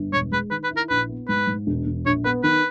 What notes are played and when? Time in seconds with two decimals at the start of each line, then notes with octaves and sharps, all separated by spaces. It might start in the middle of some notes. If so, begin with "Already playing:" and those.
Already playing: G1
0.13 E1 C#5
0.32 G#3 B4
0.51 D#3 B4
0.64 B4
0.71 E4
0.76 A#4
0.89 A#1 B4
1.09 B3
1.28 G#2 B4
1.47 G#2
1.67 E1
1.86 E1
2.06 A#1 C#5
2.25 B3 B4
2.43 D#3 B4